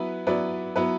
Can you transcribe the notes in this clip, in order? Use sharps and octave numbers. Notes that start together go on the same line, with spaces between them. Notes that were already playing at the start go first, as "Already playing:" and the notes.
Already playing: F#3 B3 E4 B4
F#3 B3 E4 B4 D5
F#3 B3 E4 B4